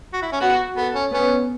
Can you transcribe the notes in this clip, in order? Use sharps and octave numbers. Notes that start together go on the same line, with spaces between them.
F#4
E4
C#4
B3 F#4
B3 A4
C#4
B3 C#4